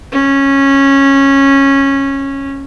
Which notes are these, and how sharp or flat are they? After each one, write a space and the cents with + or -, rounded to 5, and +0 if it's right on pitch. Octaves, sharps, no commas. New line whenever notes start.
C#4 -15